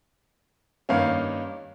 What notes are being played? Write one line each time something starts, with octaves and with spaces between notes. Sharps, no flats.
G2 D#3 A#3 C#4 F5